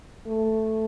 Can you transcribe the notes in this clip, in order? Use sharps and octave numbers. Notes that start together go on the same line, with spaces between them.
A3